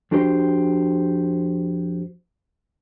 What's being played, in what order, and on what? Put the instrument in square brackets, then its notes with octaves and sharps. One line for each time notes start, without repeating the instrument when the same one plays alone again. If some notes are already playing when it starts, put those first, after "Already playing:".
[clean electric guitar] F2 D4 F#4 G4 C5